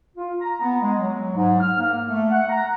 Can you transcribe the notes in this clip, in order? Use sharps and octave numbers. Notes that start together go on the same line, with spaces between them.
F4
A#5
B3
G#3
F#3
G#2
F6
A#3
A3
F#5
A#5